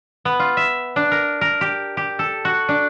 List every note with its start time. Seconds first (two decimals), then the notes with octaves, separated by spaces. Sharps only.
0.25 B3
0.40 F4
0.57 E5
0.96 D4
1.11 A#4
1.41 A#4
1.61 G4
1.97 G4
2.19 A4
2.45 F#4
2.69 D4